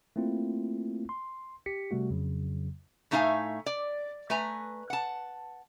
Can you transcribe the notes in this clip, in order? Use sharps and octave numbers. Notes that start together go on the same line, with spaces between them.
A3 A#3 C4 E4 F4
C6
G4 B6 C#7
C3 G3 A3 F#4
F2 C#3 F#3
A2 A3 D#4 E5 F5 G#5
D5
A3 B4 G#5 A#5
F#5 A5